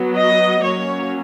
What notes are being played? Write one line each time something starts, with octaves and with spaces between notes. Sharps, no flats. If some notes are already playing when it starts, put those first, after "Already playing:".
Already playing: F#3 B3
D#5
F#3 A#3 C#4 C#5